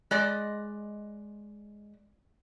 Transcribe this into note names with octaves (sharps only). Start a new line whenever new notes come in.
G#3 D5 D#5